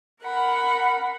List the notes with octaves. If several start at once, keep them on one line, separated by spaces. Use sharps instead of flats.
A#4 F#5 B5